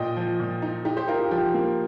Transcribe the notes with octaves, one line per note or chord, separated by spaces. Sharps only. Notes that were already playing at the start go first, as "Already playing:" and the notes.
Already playing: A#2 D#5 G5
F3
A#2
D#4
D#4 G4
G4 C5
D#4 F4 A#4
G4
F3 G4
A#3